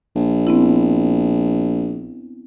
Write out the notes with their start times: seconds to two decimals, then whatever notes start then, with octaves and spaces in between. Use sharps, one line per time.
0.16 A#1
0.47 B3 C4 E4